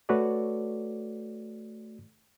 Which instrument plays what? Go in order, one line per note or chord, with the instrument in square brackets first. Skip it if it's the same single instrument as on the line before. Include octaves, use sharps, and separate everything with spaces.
[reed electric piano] A3 F#4 A4 B4 C#5 D5